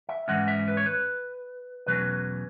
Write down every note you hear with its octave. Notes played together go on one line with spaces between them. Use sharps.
E5
G#2 E3 G#3 C#4 F#5
E5
B4
C#5
B4
E2 B2 F#3 A3 C#4 B4